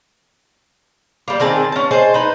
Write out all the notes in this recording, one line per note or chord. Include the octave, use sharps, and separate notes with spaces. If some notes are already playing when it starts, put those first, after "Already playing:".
G3 A#3
D#3 C4 G#4 A5
C#4 A5
G#4 C5 D#5 A5
D#4 B4